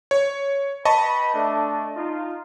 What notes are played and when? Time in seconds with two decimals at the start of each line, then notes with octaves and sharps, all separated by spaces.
0.11 C#5
0.85 B4 D#5 G5 A5 B5 C#6
1.34 A3 D4
1.96 D#4 F4